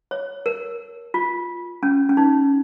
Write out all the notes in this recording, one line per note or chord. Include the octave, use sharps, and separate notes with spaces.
C#5
A#4
F4
C#4
C#4
D#4